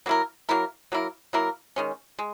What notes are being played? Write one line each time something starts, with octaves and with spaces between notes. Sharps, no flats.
F#3 A#3 E4 A#4
F#3 A#3 E4 A#4
F#3 A#3 E4 A#4
F#3 A#3 E4 A#4
D#3 G#3 C#4
G#3